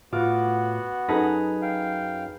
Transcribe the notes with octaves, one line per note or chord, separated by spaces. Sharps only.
A2 B3 F4 F#4 D6
F#2 D#4 G#4 A4 B4 A#5
F5 G5